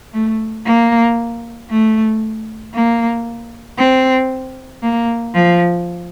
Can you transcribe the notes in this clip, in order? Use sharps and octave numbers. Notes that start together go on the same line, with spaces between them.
A3
A#3
A3
A#3
C4
A#3
F3